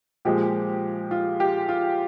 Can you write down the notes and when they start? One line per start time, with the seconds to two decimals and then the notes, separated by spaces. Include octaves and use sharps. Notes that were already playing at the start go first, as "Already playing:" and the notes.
0.25 A#2 F3 G#3 G4
1.11 F4
1.40 G4
1.69 F4